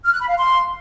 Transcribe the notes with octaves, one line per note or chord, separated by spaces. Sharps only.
F6
F#6
B5
F5
C6